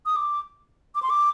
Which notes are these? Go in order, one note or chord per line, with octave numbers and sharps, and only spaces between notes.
D#6
D6
D6
C6
D6